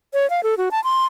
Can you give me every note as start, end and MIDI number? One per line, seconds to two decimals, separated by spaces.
0.14 0.29 73
0.30 0.43 77
0.43 0.55 69
0.58 0.69 66
0.71 0.83 81
0.84 1.05 84